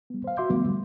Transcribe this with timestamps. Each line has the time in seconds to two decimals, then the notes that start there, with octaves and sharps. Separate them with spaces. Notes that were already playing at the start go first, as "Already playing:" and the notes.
0.10 G3 B3
0.24 C5 F5
0.37 F#4 E5 C6 D6 G6
0.49 D3 F3 G3 A3 B3
0.68 G3